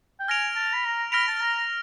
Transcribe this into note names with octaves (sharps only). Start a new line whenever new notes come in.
G5
G#5 F6 A#6 D7 F7
A5
B5
A#5
B5 F6 A#6 D7 F7
A5
A#5